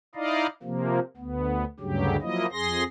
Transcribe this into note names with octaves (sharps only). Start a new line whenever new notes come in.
D#4 E4 D5 D#5 F5
C3 F3 A#3
D2 B3
D2 G2 C#3 F#3 G4
F3 F#3 A#3 E4 D#5
F2 G#4 C6 A#6